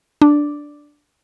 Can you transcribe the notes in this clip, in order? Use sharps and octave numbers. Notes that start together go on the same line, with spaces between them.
D4